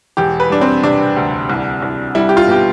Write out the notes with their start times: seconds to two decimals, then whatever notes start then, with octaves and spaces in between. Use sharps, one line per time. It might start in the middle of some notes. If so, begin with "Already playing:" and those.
0.17 E1 G4
0.40 B4
0.50 G3 D4
0.61 C4
0.83 C3 D4
1.16 D2
1.50 C2
1.82 C2
2.15 G3 E4
2.29 G4
2.37 F4
2.48 B2 G4